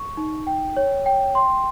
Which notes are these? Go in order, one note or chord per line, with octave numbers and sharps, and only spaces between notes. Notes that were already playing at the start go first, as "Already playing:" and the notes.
Already playing: C#6
D#4
G5
C#5
G5
C6